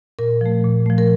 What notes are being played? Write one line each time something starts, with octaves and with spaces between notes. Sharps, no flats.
A#2 A#4
F3 A3
A#2
F3 A3
A#4